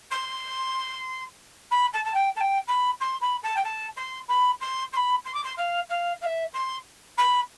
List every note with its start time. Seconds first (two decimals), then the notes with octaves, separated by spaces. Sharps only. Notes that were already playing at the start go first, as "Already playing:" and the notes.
0.11 C6
1.71 B5
1.93 A5
2.04 A5
2.14 G5
2.35 A5
2.40 G5
2.67 B5
3.00 C6
3.21 B5
3.43 A5
3.56 G5
3.64 A5
3.96 C6
4.28 B5
4.60 C6
4.92 C6
4.96 B5
5.25 C6
5.34 D6
5.43 C6
5.57 F5
5.89 F5
6.21 F5
6.25 E5
6.53 C6
7.17 B5